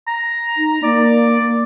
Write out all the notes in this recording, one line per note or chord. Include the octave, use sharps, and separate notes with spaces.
A#5
D#4
A#3 D5